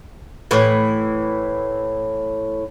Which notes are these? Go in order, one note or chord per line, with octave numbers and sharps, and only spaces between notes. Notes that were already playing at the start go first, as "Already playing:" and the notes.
A2 E3